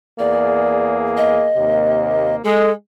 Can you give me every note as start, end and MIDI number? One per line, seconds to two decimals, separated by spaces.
0.19 1.50 40
0.19 1.50 58
0.19 1.50 68
0.19 0.95 74
1.17 2.35 75
1.57 2.38 39
1.57 2.38 48
1.57 2.38 58
2.44 2.71 56
2.44 2.71 69